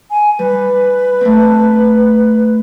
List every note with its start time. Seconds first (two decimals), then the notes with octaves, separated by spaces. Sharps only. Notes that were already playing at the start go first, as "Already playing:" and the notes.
0.10 G#5
0.39 G3 B4
1.21 A3 C4